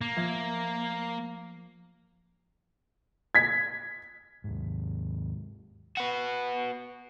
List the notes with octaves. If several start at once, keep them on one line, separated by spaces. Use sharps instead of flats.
A#3
F3 E5 G#6
G#6 B6
D#2 G#2
F#4 B4